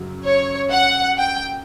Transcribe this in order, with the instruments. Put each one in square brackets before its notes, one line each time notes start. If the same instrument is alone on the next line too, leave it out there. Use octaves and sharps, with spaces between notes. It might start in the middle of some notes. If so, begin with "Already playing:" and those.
Already playing: [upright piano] F#2 C#3 F#3
[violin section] C#5
F#5
G5